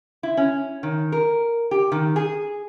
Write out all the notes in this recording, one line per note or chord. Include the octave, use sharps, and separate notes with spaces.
E4
C#4
D#3
A#4
G4
D#3
G#4